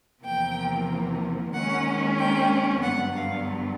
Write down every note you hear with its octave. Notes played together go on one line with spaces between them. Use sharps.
E2 C3 F3 A#3 G5
D#2 D#3 G#3 C#4 F#5
G5
G2 D3 F#3 B3 F#5
F5